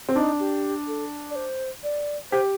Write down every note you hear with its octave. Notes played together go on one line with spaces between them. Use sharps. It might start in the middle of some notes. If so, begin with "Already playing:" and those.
C4
D4 D#4
G4
A4
D5
C5
D5
G4 C5